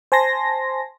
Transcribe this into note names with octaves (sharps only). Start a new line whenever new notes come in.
C5 G#5 A5 C6 A#6